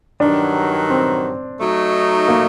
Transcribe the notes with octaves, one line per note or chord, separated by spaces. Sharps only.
G2 D#3 F#3 D4
C4
F#3 A3 D#4
A#3